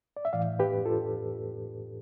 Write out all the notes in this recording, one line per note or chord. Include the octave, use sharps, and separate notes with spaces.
D5
E5
A2 E3 D5 F5
G4 B4
F4 A4